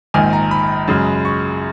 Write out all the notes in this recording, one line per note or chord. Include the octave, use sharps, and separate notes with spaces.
A#1 G#2 D#3 G#5
A#5
B5
F#2 C#3 G#3
C#6